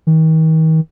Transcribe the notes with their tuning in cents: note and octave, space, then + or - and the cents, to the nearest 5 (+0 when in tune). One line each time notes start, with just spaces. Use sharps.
D#3 +40